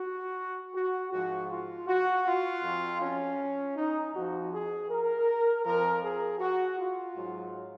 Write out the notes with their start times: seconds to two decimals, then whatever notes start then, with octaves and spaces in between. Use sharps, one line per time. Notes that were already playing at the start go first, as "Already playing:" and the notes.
Already playing: F#4
0.74 F#4
1.12 G#2 F3 F#4
1.51 F4
1.88 F#4
2.26 F4
2.63 F2 F3
3.01 C#4
3.76 D#4
4.14 F2 F3 F#4
4.51 G#4
4.89 A#4
5.64 F2 F3 A#4
6.02 G#4
6.40 F#4
6.77 F4
7.16 G#2 F#3